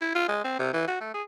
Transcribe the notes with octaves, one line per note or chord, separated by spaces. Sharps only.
E4
F4
G#3
C4
C3
E3
F#4
A3
G#4